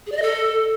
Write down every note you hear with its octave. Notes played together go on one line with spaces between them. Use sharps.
G#4
D5
D#5
A4